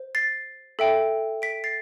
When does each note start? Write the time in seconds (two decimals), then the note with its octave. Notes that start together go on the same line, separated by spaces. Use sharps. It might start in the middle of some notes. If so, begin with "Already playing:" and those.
Already playing: C5
0.15 A6 C7
0.79 A4 E5 G5
1.42 B6 D7
1.64 A6 C7